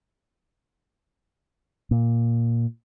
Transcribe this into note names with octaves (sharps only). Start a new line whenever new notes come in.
A#2